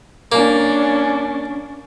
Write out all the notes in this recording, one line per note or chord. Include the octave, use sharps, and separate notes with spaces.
A#3 C#4 D4